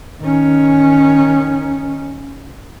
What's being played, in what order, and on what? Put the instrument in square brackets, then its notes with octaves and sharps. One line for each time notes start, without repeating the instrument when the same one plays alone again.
[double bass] D#3 C#4